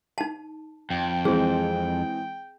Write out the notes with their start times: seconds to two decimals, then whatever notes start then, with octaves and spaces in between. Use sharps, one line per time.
0.18 D#4 A5
0.90 F2 G5
1.25 E3 G#3 C4 G#4